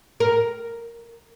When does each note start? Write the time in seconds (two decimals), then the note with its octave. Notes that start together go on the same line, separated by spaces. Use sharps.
0.20 A#4